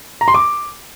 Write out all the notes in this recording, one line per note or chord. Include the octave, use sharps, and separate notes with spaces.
A#5
C6
D6